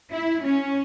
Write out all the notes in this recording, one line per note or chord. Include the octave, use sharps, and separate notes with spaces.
E4
C#4